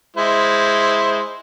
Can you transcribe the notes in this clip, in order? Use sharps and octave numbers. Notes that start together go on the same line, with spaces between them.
G#3 E4 C5